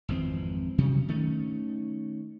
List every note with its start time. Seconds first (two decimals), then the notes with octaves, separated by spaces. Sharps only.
0.09 G#1 F2 E3 C4
0.78 C3 F#3 G3 C#4
1.08 D#3 A3 C#4